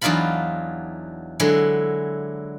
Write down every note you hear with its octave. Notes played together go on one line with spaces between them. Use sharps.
E2 F#3 D4 D#4 F4 B5
D3 F#3 G#3 E4